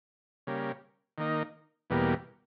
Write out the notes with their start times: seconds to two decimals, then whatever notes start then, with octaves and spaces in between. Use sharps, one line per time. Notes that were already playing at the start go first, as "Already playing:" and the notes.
0.47 C#3 G3 A#3
1.18 D#3 A#3 D#4
1.90 E2 B2 G3 A#3